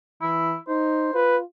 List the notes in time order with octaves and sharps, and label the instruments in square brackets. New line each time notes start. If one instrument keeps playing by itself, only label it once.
[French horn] E3 [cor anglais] E4
[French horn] D#4 [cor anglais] C5
[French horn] F4 [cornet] B4